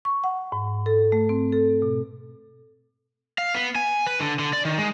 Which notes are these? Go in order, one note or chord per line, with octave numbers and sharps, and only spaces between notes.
C#6
F#5
G#2
A4
A3
C4
A4
B2
F5
B3
G#5
B4
D3
D3
D5
D#3
G#3